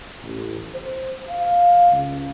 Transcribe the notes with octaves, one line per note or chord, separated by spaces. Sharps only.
A1
C5
F5
C#2